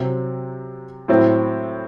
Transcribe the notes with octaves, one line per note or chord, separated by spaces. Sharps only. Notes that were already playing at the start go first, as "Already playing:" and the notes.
Already playing: C3 F#3 C4
A2 F#3 C4 E4